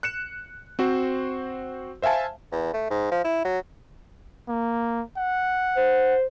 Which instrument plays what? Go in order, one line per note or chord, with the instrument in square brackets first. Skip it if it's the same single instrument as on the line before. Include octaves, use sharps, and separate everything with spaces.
[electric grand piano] F#6 C#7 E7
C4 F#4 C5
C5 E5 F5 G#5 A5
[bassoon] E2
A3
G#2
F3
E4
F#3
[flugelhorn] A#3
F#5
[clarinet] C5